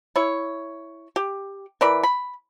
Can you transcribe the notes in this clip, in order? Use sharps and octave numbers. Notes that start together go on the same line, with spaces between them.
E4 C#5
G4
E3 A#4 D5 B5
B5